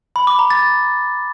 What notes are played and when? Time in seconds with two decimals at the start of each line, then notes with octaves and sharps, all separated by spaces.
0.16 B5
0.27 D6
0.39 A#5
0.50 A6